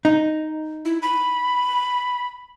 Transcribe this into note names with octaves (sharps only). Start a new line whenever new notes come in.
D#4
E4
B5